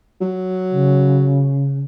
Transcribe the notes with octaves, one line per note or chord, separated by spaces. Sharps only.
F#3
C#3